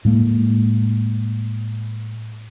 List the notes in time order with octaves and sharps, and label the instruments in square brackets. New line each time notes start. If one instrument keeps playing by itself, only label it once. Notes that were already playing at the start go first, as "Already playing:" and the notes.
[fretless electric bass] A2 G#3 A#3